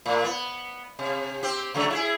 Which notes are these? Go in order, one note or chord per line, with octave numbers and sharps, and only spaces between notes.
A2
B3
C3
C4 G4
C#3 F#3 A3
E4 G4 G#4